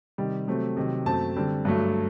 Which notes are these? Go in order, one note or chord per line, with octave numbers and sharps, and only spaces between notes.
C3 D#3 G3
C3 F#3 A3 C4
C3 D#3 F#3
F#2 F#3 A3 C4 A5
D3 G3 C4
G2 F#3 A3